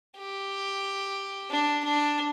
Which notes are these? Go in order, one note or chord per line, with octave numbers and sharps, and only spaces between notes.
G4
D4
D4